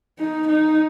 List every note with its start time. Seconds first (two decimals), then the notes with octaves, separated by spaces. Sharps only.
0.19 D#4
0.48 D#4